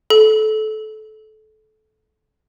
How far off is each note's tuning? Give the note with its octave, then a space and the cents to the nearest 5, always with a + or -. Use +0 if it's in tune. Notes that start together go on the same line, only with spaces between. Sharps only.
A4 -25